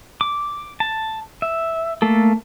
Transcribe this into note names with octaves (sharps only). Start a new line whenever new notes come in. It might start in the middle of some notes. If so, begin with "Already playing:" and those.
D6
A5
E5
A3 A#3 A4